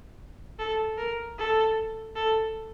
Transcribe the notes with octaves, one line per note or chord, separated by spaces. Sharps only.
A4
A#4
A4
A4